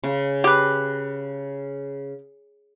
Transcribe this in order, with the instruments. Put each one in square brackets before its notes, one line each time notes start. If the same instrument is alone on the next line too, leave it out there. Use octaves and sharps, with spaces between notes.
[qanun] C#3
[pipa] G4 B4